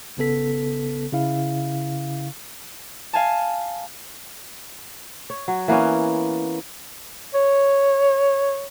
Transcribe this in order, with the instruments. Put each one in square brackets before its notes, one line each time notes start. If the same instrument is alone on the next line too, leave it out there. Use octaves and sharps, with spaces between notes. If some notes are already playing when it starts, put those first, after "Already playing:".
[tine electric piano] G#1 C#3 B3 A4 B6
C#3 E4 F5
[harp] F5 G#5 A5
[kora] C#5
F#3
E3 A#3 B3 C#4
[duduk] C#5